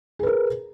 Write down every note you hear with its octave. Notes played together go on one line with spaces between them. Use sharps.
G#4 A#4 B4